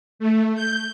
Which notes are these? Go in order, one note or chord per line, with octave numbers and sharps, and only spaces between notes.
A3
G6